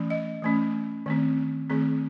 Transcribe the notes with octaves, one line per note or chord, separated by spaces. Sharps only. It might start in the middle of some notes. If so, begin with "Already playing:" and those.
Already playing: E3 A3 C#4
D#5
E3 A3 C#4
D#3 A3 C4
D#3 A3 C4 G#4